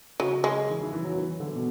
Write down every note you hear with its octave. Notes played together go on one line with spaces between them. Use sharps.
C#3 F#3
G#3
E3
E3
E3
F#3
E3
D3
B2